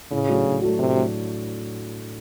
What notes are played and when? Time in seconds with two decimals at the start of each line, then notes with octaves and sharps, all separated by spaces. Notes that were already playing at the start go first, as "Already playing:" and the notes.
0.11 A2 C#3
0.28 F#3 A3 D4 F#4
0.46 A2
0.62 F#3 A3 D4 F#4
0.79 A2 C3
0.96 F#3 A3 D4 F#4